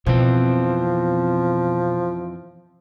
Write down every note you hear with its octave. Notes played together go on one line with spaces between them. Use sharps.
F2 B2 E3 F3 C4